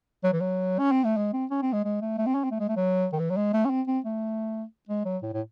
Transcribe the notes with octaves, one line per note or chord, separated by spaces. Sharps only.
F#3
E3
F#3
C#4
C4
A3
G#3
C4
C#4
C4
G#3
G#3
A3
A3
C4
C#4
C4
A3
G#3
A3
F#3
D#3
E3
F#3
G#3
A3
C#4
C4
C4
A3
G#3
F#3
A2
A2